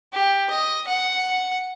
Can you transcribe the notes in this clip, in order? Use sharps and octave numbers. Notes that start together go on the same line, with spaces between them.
G4
D#5
F#5